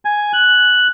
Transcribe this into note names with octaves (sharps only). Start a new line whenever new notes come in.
G#5
F#6